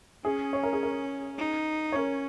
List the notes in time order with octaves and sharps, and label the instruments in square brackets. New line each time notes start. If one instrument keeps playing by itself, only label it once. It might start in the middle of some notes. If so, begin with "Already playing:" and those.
[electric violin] C#4 [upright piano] G#4
[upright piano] C#5
A#4
G#4
A#4
[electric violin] D#4
[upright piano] C#5
[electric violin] C#4 [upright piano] A#4